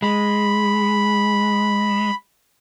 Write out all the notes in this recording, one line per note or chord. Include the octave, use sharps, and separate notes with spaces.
G#3 B5